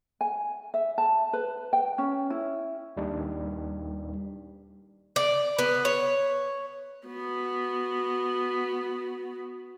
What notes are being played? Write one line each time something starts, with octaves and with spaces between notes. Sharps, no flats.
G#5
E5
A5
B4
G5
C#4
E4
D#2 G3 D4 D#4
D5
B3
C#5
B3 F#4